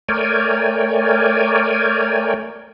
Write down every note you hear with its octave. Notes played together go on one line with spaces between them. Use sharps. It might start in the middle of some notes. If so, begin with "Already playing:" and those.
A3 A#4 C#5 D5 G5 G#5